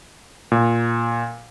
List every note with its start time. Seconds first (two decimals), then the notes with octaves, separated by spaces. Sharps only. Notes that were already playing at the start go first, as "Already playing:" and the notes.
0.52 A#2